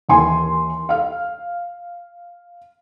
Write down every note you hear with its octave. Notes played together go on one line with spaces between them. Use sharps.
D#2 E3 G#5 C6
F5 F6